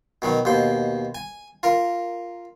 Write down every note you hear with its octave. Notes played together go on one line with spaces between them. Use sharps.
B2 D#3 F#3
D#2 B2 C5
G#5
F4 A#4